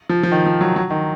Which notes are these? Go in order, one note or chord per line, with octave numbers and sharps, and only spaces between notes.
F3
F3
D#3
F3
F#3
F#3
D#3